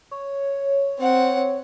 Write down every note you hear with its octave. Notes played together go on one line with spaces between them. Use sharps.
C#5
C4 F#5